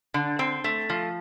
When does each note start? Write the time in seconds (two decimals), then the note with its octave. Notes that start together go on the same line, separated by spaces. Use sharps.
0.14 D3
0.39 C4
0.64 A3
0.90 F3